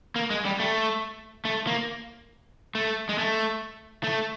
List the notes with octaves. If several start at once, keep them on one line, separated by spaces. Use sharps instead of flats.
A#3
G#3
G3
A3
A3
A#3
A3
G#3
A3
A3